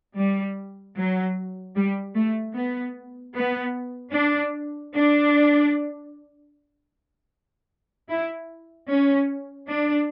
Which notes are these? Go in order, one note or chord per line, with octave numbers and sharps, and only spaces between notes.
G3
F#3
G3
A3
B3
B3
D4
D4
E4
C#4
D4